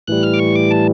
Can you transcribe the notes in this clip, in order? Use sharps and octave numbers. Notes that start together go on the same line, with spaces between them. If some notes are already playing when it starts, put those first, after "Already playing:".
A2 E3 G3 F#6
F6
D6
C#6
D6
A5